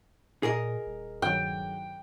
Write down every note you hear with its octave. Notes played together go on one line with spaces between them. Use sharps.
A#2 G#4 A#4 D#5
D#1
G2 D#3 F#3 G5